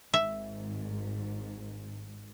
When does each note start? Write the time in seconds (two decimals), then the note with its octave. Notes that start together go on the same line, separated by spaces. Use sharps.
0.14 G#1 G#2 E5